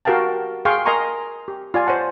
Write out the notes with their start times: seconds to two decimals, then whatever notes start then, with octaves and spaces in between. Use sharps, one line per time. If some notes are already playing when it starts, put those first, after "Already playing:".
0.05 F#4 G4 A#4 F5 G5 A5
0.65 G#4 F5 G5 G#5 C6 C#6
0.85 A#4 D#5 G#5 A#5 C6 C#6
1.48 G4
1.74 F4 D5 G#5
1.87 C5 C#5 F#5 A5